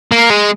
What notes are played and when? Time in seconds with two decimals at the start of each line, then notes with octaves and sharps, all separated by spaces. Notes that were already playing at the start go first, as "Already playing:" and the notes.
0.12 A#3
0.30 G#3